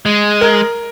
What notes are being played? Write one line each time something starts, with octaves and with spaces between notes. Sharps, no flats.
G#3
A#4